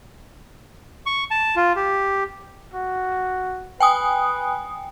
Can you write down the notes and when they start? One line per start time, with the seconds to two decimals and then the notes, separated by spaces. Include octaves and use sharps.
1.06 C#6
1.31 A5
1.56 F4
1.76 G4
2.74 F#4
3.80 B4 G5 G#5 D#6